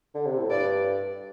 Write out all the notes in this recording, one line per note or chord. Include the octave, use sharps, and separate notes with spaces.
D3
C3
A2
G2 D5